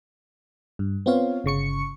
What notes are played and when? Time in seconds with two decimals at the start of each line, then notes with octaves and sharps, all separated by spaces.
0.79 G2
1.06 B3 C4 F4 C#5 F5
1.44 G1 C#3 C#6 C#7